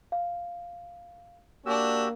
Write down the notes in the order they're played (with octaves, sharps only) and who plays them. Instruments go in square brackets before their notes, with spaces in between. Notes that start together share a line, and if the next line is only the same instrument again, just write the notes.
[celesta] F5
[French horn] A#3 [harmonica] D4 [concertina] F#4 G4 E6